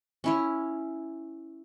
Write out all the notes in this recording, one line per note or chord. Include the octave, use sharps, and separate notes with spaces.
C#4 E4 C#5